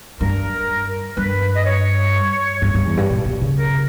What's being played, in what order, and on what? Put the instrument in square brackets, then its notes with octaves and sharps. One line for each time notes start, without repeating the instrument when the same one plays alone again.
[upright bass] G2 [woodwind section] A#4
[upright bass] G2 [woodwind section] B4
[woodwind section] D#5
C#5
[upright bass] G2
G2
E2
G2
A#2
B2
C#3
[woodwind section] A#4